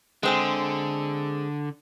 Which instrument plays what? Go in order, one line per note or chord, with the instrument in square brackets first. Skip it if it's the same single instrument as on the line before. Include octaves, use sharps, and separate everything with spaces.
[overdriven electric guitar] D3 [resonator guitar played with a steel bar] G#3 C4 G#4